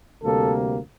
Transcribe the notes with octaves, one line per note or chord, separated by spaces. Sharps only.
D2 C3 G3 A#3 A4